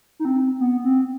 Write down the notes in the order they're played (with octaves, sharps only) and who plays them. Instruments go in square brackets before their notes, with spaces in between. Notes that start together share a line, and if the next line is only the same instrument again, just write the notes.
[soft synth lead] D#4
C4
B3
C4